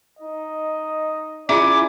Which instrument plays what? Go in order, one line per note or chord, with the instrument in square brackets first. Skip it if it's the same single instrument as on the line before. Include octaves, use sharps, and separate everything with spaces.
[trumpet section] D#4 D#5
[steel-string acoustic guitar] E2 E4 G#5 [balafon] C#4 F4 [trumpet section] G#4 D5 [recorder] D6